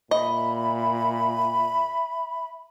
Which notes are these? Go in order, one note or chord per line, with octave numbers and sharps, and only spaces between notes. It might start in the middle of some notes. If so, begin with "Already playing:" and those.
A#2 D#5 E5 B5